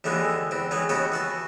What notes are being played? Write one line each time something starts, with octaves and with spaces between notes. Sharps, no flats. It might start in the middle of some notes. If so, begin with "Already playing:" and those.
D#2 D3 E3 G#3 A#3
E2 C4
D#3 F#3 G#3 B4
D#2 C#3 B3 F#4 G5 B5
E3 F#4 A5